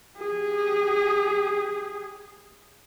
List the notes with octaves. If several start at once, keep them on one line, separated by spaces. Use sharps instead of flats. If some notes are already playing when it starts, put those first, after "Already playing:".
G4 G#4